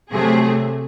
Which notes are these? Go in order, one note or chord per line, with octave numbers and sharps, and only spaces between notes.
C3 F#3 A3 G#4